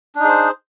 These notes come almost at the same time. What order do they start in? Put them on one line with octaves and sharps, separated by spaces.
D4 D#4 G#4 C5